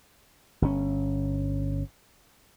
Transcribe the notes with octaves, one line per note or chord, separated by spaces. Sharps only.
G1 C3 C#4